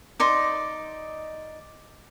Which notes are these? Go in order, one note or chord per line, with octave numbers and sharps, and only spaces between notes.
D#4 D5 D#5 C6